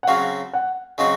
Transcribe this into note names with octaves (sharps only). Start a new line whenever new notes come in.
F#5
C#3 F#3 C4 F#4 F5
F#5
C#3 F#3 C4 F#4 D#5